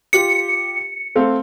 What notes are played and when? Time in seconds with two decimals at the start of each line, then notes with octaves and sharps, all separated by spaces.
0.13 F4 G4 C#7
1.16 A3 C4 F5